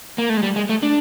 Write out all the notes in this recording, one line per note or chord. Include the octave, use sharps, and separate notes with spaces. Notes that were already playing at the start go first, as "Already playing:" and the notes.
A#3
A3
G#3
G3
G#3
A3
D4